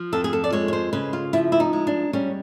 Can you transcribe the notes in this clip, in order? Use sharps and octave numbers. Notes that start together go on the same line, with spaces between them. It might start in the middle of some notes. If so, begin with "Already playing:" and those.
Already playing: F3
F2 A4
G#4
A4
D5
G#3 C#5
C#5
C5
C#3 B4
F4
F3 E4
E4
D#4
G#3
D4
G3 C#4